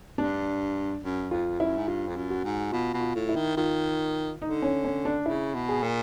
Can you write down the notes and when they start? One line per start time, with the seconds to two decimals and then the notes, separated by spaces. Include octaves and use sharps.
0.18 G2 D4
1.03 F#2
1.31 F2 F4
1.60 F#2 E4
1.77 G#2
1.88 G2 F4
2.08 F2
2.16 F#2
2.30 F#4
2.44 G#2
2.72 B2 F4
2.94 B2
3.00 F4
3.15 A2
3.29 E4
3.36 D#3
3.57 D#3 F4
4.42 D3 D#4
4.62 C#4
4.84 C#4
5.05 D4
5.26 C#3 E4
5.54 B2
5.69 G#4
5.83 A#2